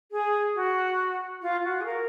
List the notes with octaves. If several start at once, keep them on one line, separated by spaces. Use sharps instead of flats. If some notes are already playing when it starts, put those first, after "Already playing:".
G#4
F#4
F4
F#4
G#4
A#4